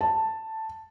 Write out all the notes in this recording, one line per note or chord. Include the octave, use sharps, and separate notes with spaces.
A5